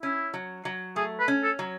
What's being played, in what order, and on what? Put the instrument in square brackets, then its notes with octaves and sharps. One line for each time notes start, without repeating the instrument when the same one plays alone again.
[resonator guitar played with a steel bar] C#4 [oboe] E4
[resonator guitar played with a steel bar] F#3
F#3
[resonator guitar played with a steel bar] A3 [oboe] G#4
[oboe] B4
[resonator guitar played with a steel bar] C#4
[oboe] A4
[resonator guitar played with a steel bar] F#3